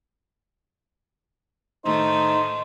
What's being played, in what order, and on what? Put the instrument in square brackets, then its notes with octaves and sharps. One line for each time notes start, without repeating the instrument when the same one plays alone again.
[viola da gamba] A2 D#3 A3 [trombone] D#4 [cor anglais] C5